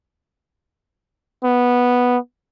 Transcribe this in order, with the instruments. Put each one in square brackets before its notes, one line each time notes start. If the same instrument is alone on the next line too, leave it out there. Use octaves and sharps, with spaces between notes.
[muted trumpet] B3